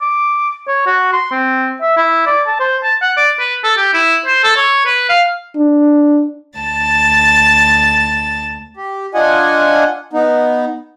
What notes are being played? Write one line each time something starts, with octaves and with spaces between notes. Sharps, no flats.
D6
C#5
F#4
C6
C4
E5
E4
D5
A5
C5
A5
F#5
D5
B4
A4
G4
E4
C5
A4
C#5
B4
F5
D4
D2 A5 A6
G4
D4 F4 D#5 F#5 G#5
B3 D#4